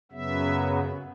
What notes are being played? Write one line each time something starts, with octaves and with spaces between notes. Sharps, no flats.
F#2 C#3 F#3 B3 E5